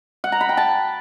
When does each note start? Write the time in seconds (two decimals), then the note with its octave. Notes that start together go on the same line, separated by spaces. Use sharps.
0.24 F#5
0.32 A#5
0.41 B5
0.49 G5
0.57 A5